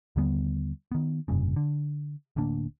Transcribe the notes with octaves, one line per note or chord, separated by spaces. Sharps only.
D#2 D3 G3 B3
D#3 B3
F1 G2 A#2 C#3
D3
D1 D2 A#3 D4